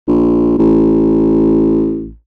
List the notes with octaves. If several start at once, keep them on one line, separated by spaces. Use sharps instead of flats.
A#1
A1